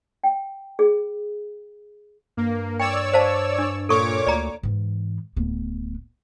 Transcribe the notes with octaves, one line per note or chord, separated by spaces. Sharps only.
G5
G#4
G2 A#3
C#5 D5 G5 E6
C5 F5 A5
D4
A#2 A4 C#5 C#6 D6
D2 D5 A#5
G#2 E3
D1 B3